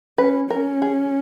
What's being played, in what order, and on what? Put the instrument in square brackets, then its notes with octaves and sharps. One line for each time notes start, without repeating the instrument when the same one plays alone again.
[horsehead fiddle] C#4 [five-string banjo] B4
[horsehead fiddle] C#4 [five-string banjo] A#4
[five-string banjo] G#4